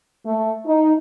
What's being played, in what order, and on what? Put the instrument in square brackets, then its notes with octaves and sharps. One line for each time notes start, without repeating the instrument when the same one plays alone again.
[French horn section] A3
D#4